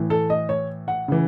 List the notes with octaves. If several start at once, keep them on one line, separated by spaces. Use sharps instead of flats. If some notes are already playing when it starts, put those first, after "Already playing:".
Already playing: A2 E3
A4
D#5
C#5
F#5
C#3 E3